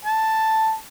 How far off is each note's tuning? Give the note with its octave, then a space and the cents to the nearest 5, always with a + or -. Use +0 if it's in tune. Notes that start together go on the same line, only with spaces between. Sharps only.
A5 +5